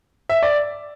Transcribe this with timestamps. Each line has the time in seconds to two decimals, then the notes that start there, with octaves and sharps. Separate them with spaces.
0.29 E5
0.43 D5